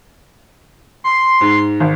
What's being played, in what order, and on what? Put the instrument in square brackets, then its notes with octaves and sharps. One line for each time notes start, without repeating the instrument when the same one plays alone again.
[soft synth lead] C6
[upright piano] G#2
G#1